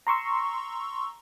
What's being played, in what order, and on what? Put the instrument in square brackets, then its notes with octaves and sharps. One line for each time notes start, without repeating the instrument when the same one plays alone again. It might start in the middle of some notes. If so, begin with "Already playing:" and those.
[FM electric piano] A#5 C6 C#6 E6